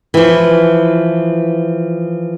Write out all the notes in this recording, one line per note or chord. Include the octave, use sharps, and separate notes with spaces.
E3 F3